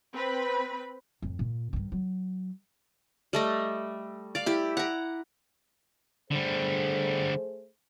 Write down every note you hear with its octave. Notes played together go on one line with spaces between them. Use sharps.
C4 B4 B5
F2 A2
A#2
G2 D#3
F#3
G3 A3 D#5
D5 F5
E4 G4
F#5 A#5
D3 G3 A3 G#4 C5